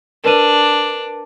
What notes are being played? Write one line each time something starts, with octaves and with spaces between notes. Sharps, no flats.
D4 A#4 B4 D#7